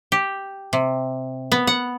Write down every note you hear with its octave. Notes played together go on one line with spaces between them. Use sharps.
G4
C3
B3
F#5